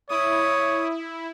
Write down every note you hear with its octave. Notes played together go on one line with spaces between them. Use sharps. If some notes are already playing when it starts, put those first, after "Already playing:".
E4 C#5 D#6